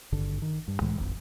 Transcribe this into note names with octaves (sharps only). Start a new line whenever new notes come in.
G#1 G2 D3
D#3
G2
C#2 A2 E3 G#3
D1 G#1 F2